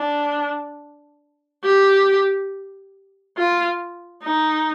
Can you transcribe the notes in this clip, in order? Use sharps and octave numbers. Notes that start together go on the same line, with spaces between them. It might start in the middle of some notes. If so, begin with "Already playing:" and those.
Already playing: D4
G4
F4
D#4